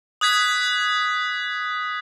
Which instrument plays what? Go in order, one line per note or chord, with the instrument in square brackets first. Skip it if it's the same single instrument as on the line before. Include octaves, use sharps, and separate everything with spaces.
[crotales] D#6 F#6 G#6 B6